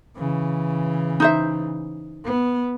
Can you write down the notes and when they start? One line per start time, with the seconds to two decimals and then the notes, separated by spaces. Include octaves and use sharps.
0.17 C#3 E3
1.20 D#4 C5 E5
2.26 B3